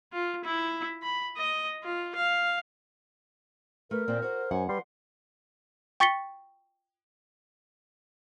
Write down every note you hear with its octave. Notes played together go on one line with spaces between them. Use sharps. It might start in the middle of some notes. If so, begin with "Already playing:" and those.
F4
E4
B5
D#5
F4
F5
A3 A#4 B4
A#2 A#3 C4 D5
F#4 C5
F#2 F#5 G#5
G3 B4 C6
G5 C#6 A6 B6 C#7 G7